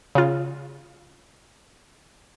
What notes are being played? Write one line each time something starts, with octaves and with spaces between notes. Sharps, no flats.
C#3 F4